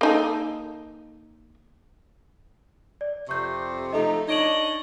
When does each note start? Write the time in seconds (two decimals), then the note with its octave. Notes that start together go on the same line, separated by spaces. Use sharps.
0.01 A#3 D#4 A4
3.01 D5
3.29 F2 C3 C#6 G6
3.93 F3 A3 D#4 A4 D#5
4.28 D4 D#4 C#5 D#5 D7 F#7